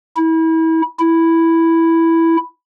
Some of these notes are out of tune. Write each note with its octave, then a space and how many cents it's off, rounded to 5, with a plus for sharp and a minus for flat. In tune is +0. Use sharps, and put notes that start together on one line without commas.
E4 -30
E4 +0